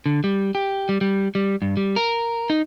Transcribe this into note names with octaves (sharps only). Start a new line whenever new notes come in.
D3
G3
G4
G3
G3
G3
G2
G3
A#4
D#4